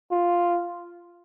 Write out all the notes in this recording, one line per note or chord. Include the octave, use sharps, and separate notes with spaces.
F4